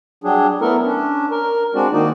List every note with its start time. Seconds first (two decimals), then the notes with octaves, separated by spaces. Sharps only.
0.24 F#3 G3 D4 G#4
0.61 A3 B3 E4 A4 A#4
0.85 C#4 D4
1.31 A#4
1.75 G#3 C4 D4 F#4 D5
1.93 D#3 A#3 D#4 F#4 D5